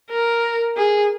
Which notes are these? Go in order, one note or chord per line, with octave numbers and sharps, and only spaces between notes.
A#4
G#4